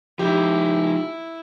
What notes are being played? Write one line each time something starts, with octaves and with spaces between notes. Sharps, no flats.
F3 D#4 E4 G4